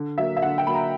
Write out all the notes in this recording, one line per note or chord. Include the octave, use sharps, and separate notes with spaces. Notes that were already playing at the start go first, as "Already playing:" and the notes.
Already playing: D3
F#3 A#3 E5
E5
D3 F#5
G5
F#3 A#3 B5
A#5